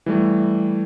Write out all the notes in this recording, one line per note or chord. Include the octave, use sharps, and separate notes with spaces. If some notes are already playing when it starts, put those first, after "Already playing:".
E3 G3 A3